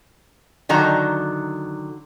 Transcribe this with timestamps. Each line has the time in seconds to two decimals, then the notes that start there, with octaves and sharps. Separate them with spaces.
0.69 D3 D#3 F#3 A#5